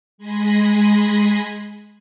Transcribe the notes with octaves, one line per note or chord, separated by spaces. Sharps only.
G#3 G#5 B5 C6 A#6